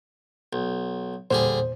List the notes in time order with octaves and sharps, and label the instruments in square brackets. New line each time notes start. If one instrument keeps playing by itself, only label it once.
[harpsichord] B1
[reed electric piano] E2 A#2 C5 [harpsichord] D3 G3 G#4